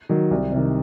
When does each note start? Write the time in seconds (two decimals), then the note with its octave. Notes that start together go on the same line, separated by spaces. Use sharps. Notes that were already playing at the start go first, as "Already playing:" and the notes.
0.09 D#3 F#3
0.31 C2
0.52 C3 D#3